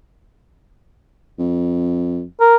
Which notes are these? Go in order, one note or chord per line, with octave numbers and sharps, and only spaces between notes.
F2
A#4